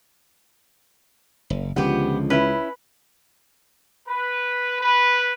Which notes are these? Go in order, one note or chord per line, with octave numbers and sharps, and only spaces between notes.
F#1
C#2 D3 F3 B3 G4
C#4 E4 B4
B4
B4